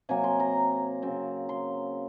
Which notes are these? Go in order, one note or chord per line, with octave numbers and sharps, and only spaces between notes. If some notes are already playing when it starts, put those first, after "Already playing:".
C3 F#3 A#3 G#5
C6
A#5
C#3 F#3 C4
C6